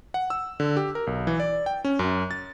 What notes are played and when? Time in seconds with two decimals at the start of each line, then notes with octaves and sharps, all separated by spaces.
0.14 F#5
0.30 E6
0.60 D3
0.77 G4
0.95 A#4
1.07 B1
1.27 E3
1.40 D5
1.66 G5
1.85 C#4
1.99 F#2
2.31 A6